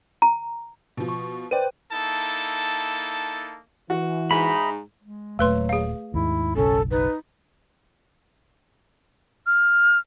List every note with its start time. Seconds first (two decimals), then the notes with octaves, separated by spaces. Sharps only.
0.22 A#5
0.97 B2 F3
1.09 C#6
1.51 B4 C5 D5 G5 D#7
1.93 A#3 D#4 E4 A4 A5
3.90 E3 F#4
4.31 G#2 D#4 E5 B5
5.02 G#3
5.39 D#1 A#2 F#3 A3 B4 C6
5.69 G#4 F5
6.14 D#2 G#2 E4
6.56 F#1 B1 C#4 A4
6.91 D#4 B4
9.46 F6